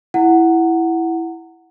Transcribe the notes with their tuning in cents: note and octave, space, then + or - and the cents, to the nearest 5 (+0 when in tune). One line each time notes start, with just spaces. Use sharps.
E4 +0 F#5 +0 A#5 -35